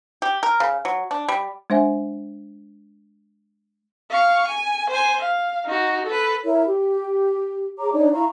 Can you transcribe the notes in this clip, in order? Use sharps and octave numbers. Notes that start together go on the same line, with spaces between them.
G4
A#4
C#3
F#3
D4
G3
G#3 D4 C5 E5 G#5
F5 C#6
G#5
C5 G#5
F5
D#4 F#4
A4 B4
E4 A#4 C#5
G4
G#4 C#5 A#5 D6
D4 D#4 C#5 D5
E4 F5 A#5 C#6